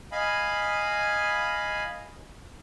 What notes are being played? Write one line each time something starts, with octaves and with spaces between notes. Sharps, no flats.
D#5 F5 G#5 B5